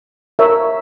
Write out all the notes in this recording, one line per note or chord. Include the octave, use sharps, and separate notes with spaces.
A#4 C#5 E5